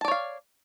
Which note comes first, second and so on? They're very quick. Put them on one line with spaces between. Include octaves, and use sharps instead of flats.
A5 D5 C#5 F5